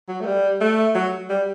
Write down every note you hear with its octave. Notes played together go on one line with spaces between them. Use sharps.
F#3
A3
G3
A3
F#3
G3